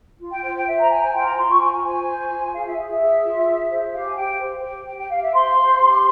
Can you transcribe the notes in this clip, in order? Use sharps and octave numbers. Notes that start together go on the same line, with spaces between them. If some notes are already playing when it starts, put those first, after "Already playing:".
F4
G5
C5 G5
G5
C5 E5
A#5
C5 G#5
G#5
F4 G5
A#5
F4 C6
C#6
F4 G#5
C5 G#5
C5
F4
G#4 F5
E5
G#4
E5
G#4
F4
G#4
C5
G4 F5
G#5
G4 G5
C5
G4
G4 G5
G5
G4 F5
E5
C5 C6
C5
G4